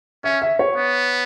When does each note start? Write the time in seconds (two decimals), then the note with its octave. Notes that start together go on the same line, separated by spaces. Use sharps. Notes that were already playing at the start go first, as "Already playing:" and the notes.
0.24 C#4 E5
0.42 E5
0.59 C#5
0.76 B3